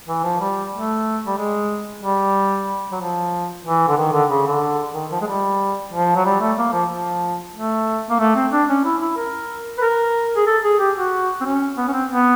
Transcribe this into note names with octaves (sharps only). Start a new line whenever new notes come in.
E3
F3
G3
A3
G3
G#3
G3
F#3
F3
E3
D3
D#3
D3
C#3
D3
D#3
F3
G#3
G3
F3
F#3
G3
A3
A#3
F3
F3
A3
A#3
A3
C4
D4
C#4
E4
E4
A#4
B4
A#4
G#4
A4
G#4
G4
F#4
C4
C#4
B3
C#4
C4
B3